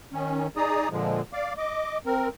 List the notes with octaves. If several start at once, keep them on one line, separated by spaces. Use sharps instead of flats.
D#3 C#4
D#4 G#4 D5 A#5 D#6
A#2 D3 F3 G#3
D5 F5 D6
D#5 D6
C4 A#4